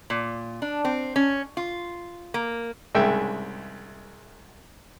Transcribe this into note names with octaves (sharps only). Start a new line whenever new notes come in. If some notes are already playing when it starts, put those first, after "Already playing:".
A#2
D4
C4
C#4
F4
A#3
C2 G#2 C#3 E5 G5